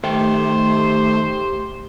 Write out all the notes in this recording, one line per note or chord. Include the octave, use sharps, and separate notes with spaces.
D#3 A3 G4 A4 C5 G5